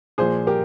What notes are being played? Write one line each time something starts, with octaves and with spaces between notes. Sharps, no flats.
A#2 F3 G#4 C5
G4 A#4